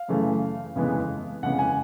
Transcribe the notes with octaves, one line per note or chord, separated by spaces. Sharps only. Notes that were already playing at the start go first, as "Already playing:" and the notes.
Already playing: F5
F#2 C#3 E3 A3
F2 C#3 E3 G#3 B3
F2 C#3 E3 G#3 B3 F#5
G#5